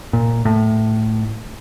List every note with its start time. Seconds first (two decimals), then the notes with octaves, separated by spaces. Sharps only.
0.13 A#2
0.45 A2